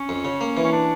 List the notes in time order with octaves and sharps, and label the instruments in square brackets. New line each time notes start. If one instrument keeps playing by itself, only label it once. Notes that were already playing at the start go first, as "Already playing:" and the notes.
Already playing: [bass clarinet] C#4
[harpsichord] F2
C#3
A#3
E3
[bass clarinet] C#4
D4